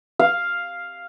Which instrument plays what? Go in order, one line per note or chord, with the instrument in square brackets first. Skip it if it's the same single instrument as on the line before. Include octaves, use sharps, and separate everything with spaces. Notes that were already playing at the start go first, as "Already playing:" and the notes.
[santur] F5